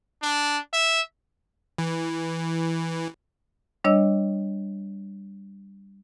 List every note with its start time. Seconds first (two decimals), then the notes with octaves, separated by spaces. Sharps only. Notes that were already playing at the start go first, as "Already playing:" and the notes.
0.22 D4
0.73 E5
1.78 E3
3.84 G3 D4 C#5 D#5 E6